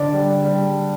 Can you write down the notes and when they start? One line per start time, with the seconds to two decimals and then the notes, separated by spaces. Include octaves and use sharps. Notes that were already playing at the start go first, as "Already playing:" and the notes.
Already playing: D3 D5
0.13 G3
0.44 G3